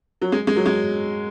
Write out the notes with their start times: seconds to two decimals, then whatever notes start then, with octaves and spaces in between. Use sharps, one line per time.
0.22 F#3
0.32 G#3
0.47 G#3
0.56 F#3
0.66 G#3